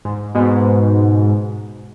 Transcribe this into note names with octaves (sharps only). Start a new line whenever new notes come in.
G#2
G#2 B2